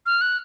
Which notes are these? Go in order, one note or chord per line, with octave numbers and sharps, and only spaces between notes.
F6
F#6